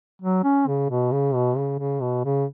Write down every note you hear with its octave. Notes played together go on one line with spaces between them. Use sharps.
F#3
C#4
C#3
B2
C#3
B2
C#3
C#3
B2
C#3